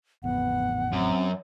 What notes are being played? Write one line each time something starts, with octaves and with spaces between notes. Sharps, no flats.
A1 F2 B3 F#5
F#2 C4